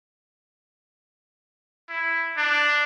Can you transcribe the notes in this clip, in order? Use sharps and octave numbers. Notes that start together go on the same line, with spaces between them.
E4
D4